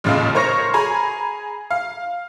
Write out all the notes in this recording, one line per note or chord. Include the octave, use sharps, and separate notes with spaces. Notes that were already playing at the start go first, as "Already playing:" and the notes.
A1 D#2 A#2 C#3 G#3 F5
A#4 C5 C#5 C#6 F6 A#6
G#4 G#5 A#5 B5
F5